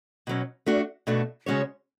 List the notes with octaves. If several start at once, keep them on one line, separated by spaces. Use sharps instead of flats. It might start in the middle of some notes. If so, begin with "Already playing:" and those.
B2 F#3 C#4
A3 D4 F#4
B2 A3 D4 F#4
C#3 G#3 C#4 F#4 C#5